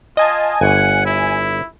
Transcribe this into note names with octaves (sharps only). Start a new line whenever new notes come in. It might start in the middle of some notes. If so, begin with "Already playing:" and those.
F4 D#5 G#5 A5
G1 F#5 G#5
E4